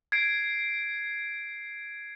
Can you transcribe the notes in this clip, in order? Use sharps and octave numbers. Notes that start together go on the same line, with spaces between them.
G#6 C7 D7